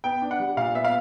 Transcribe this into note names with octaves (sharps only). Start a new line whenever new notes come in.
B3 G5
D4
F#5
G3
A#2 F5
B3 E5
F5